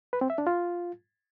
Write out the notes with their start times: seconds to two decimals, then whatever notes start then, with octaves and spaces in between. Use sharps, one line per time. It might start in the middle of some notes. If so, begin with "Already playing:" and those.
0.13 B4
0.21 C4
0.30 E5
0.38 D4
0.47 F4